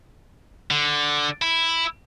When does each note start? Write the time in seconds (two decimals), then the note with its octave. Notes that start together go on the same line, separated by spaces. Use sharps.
0.71 D3
1.42 E4